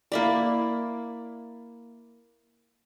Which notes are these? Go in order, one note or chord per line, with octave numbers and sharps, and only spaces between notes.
A#3 E4 D5